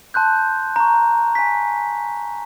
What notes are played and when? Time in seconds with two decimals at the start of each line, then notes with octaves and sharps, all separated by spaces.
0.14 A5 C6 F#6 G6
0.76 A#5 C#6
1.35 G#5 B6